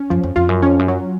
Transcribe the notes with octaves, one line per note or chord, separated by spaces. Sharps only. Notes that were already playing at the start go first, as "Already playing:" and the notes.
Already playing: C#4
F#2 F3
F2
F2 F4
F#2
F2 C#4
F#2
F#3